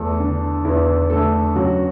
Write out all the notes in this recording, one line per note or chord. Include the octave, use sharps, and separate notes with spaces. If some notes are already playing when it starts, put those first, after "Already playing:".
Already playing: E2 A3 A4
D3
E2 E3 E4
D3 A3 A4
F#2 F#3 F#4